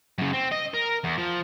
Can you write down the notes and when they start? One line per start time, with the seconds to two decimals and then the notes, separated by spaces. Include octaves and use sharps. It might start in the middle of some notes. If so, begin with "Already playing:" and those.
0.18 F#2 C#3
0.33 C4
0.51 D#5
0.74 A#4
1.04 E2
1.18 F3